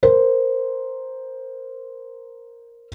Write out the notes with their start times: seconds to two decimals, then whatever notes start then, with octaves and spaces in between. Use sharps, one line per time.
0.03 A#4 C5